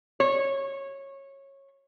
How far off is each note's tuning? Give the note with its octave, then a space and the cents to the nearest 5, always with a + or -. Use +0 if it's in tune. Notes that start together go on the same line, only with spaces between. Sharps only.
C#5 -15